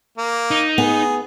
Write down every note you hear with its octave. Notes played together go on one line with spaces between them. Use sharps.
A#3
D#4
B3 G#4